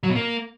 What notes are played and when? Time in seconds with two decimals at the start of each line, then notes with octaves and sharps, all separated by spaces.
0.03 F#3
0.09 B2
0.15 A#3